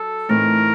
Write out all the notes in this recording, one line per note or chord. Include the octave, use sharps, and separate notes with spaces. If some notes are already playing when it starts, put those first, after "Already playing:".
Already playing: F#3 A4
A2 E3 A3 C4 D#4 A#4